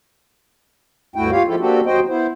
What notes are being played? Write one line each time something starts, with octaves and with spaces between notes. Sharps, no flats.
D2 G2 A3 E4 F#4 G5
F4 G4 C#5 F5
F3 G#3 E4 F4 G4 A4
A#3 C4 D4 F#4 G4 A4
D#2 F#3 F#4 C5 D#5 G5
B3 E4 C5